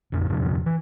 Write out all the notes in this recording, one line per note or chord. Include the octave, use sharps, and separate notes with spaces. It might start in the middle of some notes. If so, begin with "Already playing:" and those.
A#1 F2 C#3
E2 G2 C3 F3
E3